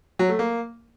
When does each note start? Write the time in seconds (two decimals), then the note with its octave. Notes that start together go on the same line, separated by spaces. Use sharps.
0.19 F#3
0.29 A3
0.39 A#3